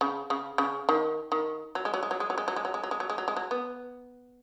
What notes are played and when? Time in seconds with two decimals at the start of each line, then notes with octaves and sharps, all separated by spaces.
0.01 C#3
0.30 C#3
0.58 C#3
0.89 D#3
1.32 D#3
1.75 F#3
1.85 G#3
1.94 F#3
2.03 G#3
2.11 F#3
2.20 G#3
2.30 F#3
2.38 G#3
2.48 F#3
2.56 G#3
2.65 F#3
2.74 G#3
2.83 F#3
2.91 G#3
3.00 F#3
3.10 G#3
3.18 F#3
3.28 G#3
3.36 F#3
3.51 B3